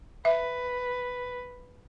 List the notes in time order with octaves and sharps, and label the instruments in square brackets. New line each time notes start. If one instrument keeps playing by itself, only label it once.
[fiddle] B4 [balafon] E5